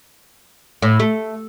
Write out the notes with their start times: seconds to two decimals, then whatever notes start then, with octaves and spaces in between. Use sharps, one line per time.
0.82 A2
1.00 A3